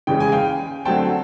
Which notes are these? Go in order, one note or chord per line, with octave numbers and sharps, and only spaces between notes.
C#3 E3 G#3 C#4 G5
G#5
F5 G5
D3 F#3 A3 C4 G5 A5